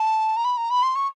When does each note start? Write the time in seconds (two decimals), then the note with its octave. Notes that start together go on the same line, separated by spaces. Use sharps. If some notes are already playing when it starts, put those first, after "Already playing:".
Already playing: A5
0.37 A#5
0.45 B5
0.57 A#5
0.70 B5
0.83 C6
0.96 C#6